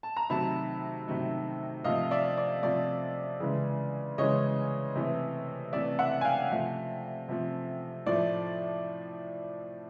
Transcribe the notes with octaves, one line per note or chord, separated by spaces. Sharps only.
A5
A#5
C3 D#3 F#3 A3 A5 B5
C3 D#3 F#3 A3
C3 F3 A3 D#5 F5
D5 E5
D5
C3 F3 A3 D5
C#3 E3 G#3
C#3 E3 G#3 C#5 D#5
C3 E3 A3
C3 E3 A3 D5 E5
E5 F#5
G#5
F5 G5
C3 F3 A3
C3 F3 A3
A2 F3 A3 D5